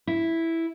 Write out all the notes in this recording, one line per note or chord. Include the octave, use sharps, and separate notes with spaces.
E4